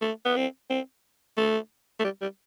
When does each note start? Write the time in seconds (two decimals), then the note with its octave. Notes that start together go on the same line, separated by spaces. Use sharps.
0.02 A3
0.25 B3
0.36 C4
0.70 C4
1.37 A3
2.00 A3
2.04 G3
2.22 G3